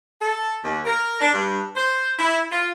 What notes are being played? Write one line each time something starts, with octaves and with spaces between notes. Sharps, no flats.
A4
D#2
A#4
D4
G2
C5
E4
F4